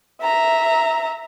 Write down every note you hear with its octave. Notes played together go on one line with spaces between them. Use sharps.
E5 A#5